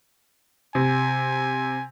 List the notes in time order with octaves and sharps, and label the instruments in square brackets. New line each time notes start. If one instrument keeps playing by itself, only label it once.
[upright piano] C3 [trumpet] G#5